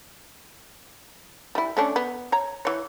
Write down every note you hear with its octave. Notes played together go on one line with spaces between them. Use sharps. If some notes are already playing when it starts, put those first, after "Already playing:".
G3 E4
A3 C#4 D4
B3
C#5 A#5
E3 C#5